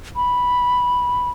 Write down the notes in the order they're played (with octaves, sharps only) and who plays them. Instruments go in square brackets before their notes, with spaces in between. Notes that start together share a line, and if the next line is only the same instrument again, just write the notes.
[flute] B5